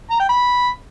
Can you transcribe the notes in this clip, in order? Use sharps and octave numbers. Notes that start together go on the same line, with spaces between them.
A#5
G5
B5